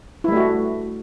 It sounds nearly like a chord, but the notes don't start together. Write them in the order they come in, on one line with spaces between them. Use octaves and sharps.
E4 G3 A3 F#4